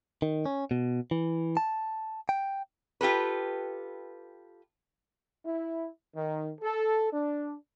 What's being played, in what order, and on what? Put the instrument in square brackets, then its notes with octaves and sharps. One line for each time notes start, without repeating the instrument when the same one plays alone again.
[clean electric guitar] D#3
C#4
B2
E3
A5
G5
[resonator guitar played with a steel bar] F4 G4 A4 B4
[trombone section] E4
D#3
A4
D4